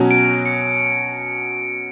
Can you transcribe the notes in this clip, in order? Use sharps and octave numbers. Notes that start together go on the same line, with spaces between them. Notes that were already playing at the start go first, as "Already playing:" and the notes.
Already playing: B2 F#3 C#4
D7
C#7